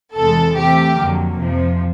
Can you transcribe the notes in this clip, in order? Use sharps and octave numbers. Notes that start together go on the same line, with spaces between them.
E2 C3 E3 G#3 A4
C3 E3 A3 G4
F2 D3 F#3 A#3
F2 C3 F3